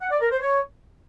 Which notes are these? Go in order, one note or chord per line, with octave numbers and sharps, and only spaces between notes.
F#5
D5
A#4
C5
C#5